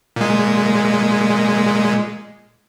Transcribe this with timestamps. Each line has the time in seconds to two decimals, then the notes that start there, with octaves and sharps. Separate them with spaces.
0.16 A#2 G#3